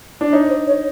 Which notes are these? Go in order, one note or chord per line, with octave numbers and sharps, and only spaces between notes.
D4
D#4 C#5
C5
C#5